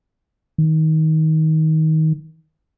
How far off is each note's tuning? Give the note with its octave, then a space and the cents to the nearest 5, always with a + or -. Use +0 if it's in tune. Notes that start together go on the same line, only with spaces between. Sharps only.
D#3 +20